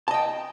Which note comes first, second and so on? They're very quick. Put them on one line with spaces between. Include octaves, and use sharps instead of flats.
A5 D#5 G5